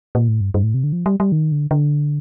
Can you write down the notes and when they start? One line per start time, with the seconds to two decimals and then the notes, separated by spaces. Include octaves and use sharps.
0.15 A#2
0.28 A2
0.41 G2
0.54 G2
0.63 A2
0.74 C3
0.84 D3
0.93 F3
1.06 G3
1.20 G3
1.32 D#3
1.52 D3
1.71 D3